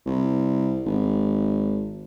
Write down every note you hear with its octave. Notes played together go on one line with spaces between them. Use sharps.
C2
G#1